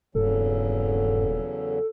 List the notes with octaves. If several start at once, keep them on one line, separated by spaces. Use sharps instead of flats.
D#1 E2 G2 C#3 F#3 A4